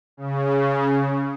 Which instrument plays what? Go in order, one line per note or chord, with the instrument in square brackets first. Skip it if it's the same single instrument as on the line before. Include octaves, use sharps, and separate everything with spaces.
[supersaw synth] C#3